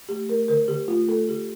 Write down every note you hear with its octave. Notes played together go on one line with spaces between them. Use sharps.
A3 G4
A3 A#4
D3 A#4
D3 G4
A3 F4
A3 A4
D3 G4